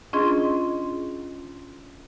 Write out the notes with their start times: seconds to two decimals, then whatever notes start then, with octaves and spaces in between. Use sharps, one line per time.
0.13 C#4 D4 F4 G#4 D#5 C6